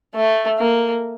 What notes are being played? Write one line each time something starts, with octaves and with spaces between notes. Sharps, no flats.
A3
A#3